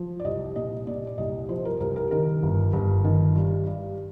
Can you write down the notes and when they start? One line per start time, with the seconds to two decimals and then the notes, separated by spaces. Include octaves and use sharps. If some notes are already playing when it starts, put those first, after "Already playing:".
Already playing: F3
0.20 D5
0.24 C2 D#5
0.56 A#2 D#5
0.87 A#2 D5
1.07 D5
1.18 C2 D#5
1.49 F3 C5
1.65 A#4
1.80 C2 A#4
1.96 A#4
2.11 D#3 A#4
2.43 G1
2.73 G1
3.04 D#3
3.35 G2
3.67 G2